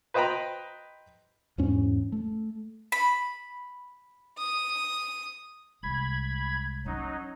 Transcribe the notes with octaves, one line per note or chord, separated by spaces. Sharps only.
B4 C5 D#5 G5 A#5 B5
E2 G#2 C#4
A3
B5
D#6
C2 G#3 B5 G#6
F#3 C#4 D#4